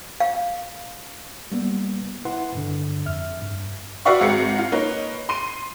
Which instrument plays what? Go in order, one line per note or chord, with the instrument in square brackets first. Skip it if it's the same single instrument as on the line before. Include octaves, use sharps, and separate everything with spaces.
[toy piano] F5
[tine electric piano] G3 A#3 B3
E4 B4 F#5 C6
G2 D3
F2 E5 F6
G2
[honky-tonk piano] F#4 B4 D5 E5 F5 C#6
G#1 G#3 C4 F#4 C#7
F4
A#3 D#4 B4 C#5
C6 D#7